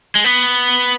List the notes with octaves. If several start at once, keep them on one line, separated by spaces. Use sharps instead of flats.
G#3
B3